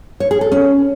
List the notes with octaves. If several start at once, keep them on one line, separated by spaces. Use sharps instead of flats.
C#5
G#4
A4
C#4